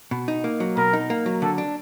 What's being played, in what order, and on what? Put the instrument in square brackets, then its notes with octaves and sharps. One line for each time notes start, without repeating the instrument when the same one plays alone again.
[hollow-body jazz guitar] B2
D#4
A#3
F#3
[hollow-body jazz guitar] B2 [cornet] A#4
[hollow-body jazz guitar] D#4
A#3
F#3
[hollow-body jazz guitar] D3 [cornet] A4
[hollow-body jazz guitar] D4